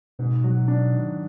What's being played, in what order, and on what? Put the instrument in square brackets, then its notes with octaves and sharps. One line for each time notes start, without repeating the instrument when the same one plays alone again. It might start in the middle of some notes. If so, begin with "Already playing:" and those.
[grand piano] G#2 [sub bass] B2
[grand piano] F#3
D4
D#3